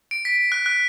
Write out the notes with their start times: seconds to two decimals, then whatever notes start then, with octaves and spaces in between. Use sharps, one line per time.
0.11 D7
0.25 B6
0.52 F#6
0.66 F#6